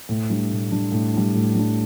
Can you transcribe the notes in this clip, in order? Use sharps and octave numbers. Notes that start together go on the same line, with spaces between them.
A2
G3 D4
A2
G3 D4
A2
G3 D4
A2
G3 D4